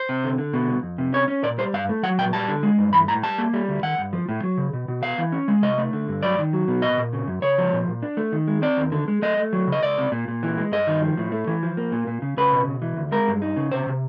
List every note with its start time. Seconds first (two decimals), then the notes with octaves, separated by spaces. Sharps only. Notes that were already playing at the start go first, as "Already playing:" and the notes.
Already playing: C5
0.09 C3
0.24 D3
0.38 D3
0.53 B2
0.68 C2
0.83 F2
0.98 C3
1.13 C#4 C#5
1.28 C#4
1.43 A#2 D5
1.58 G3 C5
1.73 G2 F5
1.89 A3
2.03 F#3 F#5
2.18 A#2 G5
2.33 G3 A5
2.48 D3
2.63 G#3
2.78 G2
2.93 E3 B5
3.08 A2 A#5
3.23 G3 A5
3.38 A#3
3.54 G3
3.68 D2
3.83 D#3 F#5
3.98 G2
4.13 F3
4.29 A2
4.43 F#3
4.57 C#3
4.73 B2
4.88 B2
5.03 B3 F5
5.18 E3
5.32 C#4
5.48 G#3
5.62 C3 D#5
5.78 A3
5.93 D3
6.08 G2
6.23 F#3 D5
6.38 D#3
6.53 F#3
6.68 B2
6.82 A#2 D#5
6.97 A#2
7.13 C#3
7.27 F#2
7.42 C#3 C#5
7.58 F3
7.73 A#2
7.88 A#2
8.02 D4
8.17 A3
8.32 D#3
8.48 G#3
8.62 C4 D5
8.77 D#2
8.92 D3
9.08 G#3
9.22 A3 D#5
9.37 A3
9.53 F#3
9.67 C#3
9.72 D#5
9.83 C#2 D5
9.98 C3
10.12 A#2
10.28 A#2
10.43 E3
10.58 G#3
10.72 G2 D#5
10.87 D#3
11.02 F3
11.17 A2
11.32 A3
11.47 E3
11.63 F3
11.77 A#3
11.92 A#2
12.07 A#2
12.22 C#3
12.37 C#3 B4
12.52 B2
12.68 B2
12.82 E3
12.97 D2
13.12 G#3 A#4
13.28 G2
13.42 D#4
13.56 C#3
13.72 C3 C5
13.86 C3